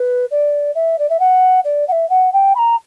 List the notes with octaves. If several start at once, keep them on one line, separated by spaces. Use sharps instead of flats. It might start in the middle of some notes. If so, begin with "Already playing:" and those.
Already playing: B4
D5
E5
D5
E5
F#5
D5
F#5
E5
F#5
G5
B5
A#5